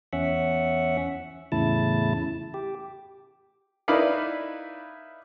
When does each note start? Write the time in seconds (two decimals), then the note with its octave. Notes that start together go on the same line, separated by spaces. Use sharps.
0.13 E2 C#4 E5 F#5
1.52 E2 A2 C#3 E4 A5
2.54 G4
3.88 D#4 E4 B4 D5 F5